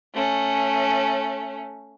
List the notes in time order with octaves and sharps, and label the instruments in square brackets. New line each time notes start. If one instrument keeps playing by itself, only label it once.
[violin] A3 C#4